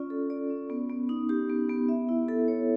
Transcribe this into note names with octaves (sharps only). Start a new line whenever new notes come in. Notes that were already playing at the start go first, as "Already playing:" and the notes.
Already playing: C#4 F4 D5
A4
D5
C#4
B3
B3
D#4
G4
B3
B3
E5
E4
A4
C#5